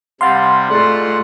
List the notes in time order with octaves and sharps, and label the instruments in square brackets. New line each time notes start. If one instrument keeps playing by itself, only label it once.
[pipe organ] C3 G3 [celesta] F5 F#5 B5 [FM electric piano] C6 F6 A6
[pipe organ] G#2 F#5 [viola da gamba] A3 F4 [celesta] G#4 A4 D5